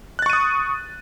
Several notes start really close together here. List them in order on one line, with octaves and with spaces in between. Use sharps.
F#6 A6 C#6 D#7 D#6